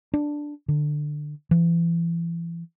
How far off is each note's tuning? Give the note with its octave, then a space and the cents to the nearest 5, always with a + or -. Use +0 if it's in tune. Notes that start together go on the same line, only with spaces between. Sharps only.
D4 +0
D3 +20
E3 +35